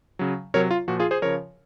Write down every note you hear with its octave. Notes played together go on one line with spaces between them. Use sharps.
C#3 F#3
C3 F#3 A#4 C#5
F4
A#2 F3 F#4
F4 G#4
G#4 C5
C#3 F3 A#4 C#5